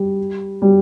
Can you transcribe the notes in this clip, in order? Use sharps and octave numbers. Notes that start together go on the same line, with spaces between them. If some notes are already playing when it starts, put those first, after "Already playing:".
Already playing: G3
G3